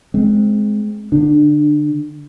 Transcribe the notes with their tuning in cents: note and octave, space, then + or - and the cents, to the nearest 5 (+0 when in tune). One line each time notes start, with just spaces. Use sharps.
G#3 +15 C4 +0
D3 +5 D4 +25